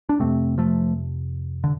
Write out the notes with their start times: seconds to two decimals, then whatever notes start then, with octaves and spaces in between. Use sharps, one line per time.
0.09 D4
0.20 F2 C3 A3 C4
0.58 F3 A3
1.64 D3